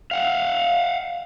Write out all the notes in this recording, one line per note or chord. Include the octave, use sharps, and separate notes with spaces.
F5 F#5